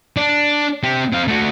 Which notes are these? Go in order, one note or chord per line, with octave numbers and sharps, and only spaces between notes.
D4
C4 G4
C4 F5
A3 F#4